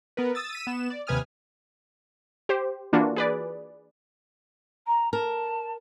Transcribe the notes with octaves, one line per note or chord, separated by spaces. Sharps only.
B3 A#4 B4
D#6 E6 A6
E6 B6 D#7
B3 E7
D5
D#2 C3 B4 G#5 D#6 F6
G4 C5
E3 A#3 D4 F4 F#4
G#4 B4 D5
A#5
A#4 A5